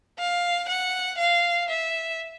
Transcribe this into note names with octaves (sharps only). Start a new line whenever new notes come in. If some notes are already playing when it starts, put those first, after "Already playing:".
F5
F#5
F5
E5